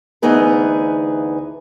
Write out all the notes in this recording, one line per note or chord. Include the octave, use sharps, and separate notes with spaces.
D2 E3 B3 D#4 G#4 B4